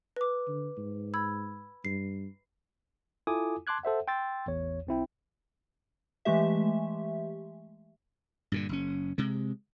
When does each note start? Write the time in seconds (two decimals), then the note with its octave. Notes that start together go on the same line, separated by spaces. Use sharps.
0.16 B4 D6
0.48 D3
0.78 G#2
1.14 B5 E6 G#6
1.85 G2 C7
3.27 E4 F4 A4 G#5 D6 D#6
3.67 A5 C6 D6 F#6 G#6
3.83 A4 C5 E5 F#5
4.08 G5 C6 E6 A6
4.46 A1 E2 C#5
4.87 B1 C4 E4 G5
6.25 E3 G#3 A3 G4 E5
8.52 G2 A#2 D3
8.69 F#1 C#4
9.18 C3 G#3